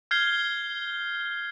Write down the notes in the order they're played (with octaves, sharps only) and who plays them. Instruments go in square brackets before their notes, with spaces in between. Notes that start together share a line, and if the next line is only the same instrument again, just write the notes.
[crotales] F6 G6 G#6 C7 G7